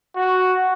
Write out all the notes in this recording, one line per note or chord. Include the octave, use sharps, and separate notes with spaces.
F#4